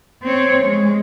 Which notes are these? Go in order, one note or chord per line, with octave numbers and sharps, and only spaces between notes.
C4 C#5
G#3